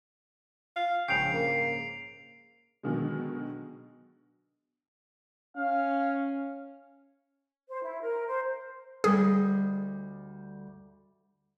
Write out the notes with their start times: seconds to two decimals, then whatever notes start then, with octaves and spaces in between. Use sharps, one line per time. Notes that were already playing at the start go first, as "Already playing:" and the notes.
0.76 F5
1.08 A#1 G#2 C#3 G5 C7 D7 F7
1.33 A#3
2.83 B2 D3 D#3 F#3 G#3
5.56 C#4 F5
7.69 C5
7.82 E4
8.01 A#4
8.27 C5
9.04 D2 G3 G#4 D#5